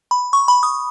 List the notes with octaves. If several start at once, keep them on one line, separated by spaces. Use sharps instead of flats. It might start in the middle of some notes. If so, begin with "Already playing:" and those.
B5
C#6
B5
D#6